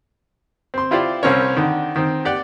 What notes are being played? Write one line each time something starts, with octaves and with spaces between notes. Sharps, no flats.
C4 C6
E4 F4 G4 C5 D5
C2 C4 C#4 A#4 C#5
D3 D#3
D#3 C4
G4 D5 F#5 G5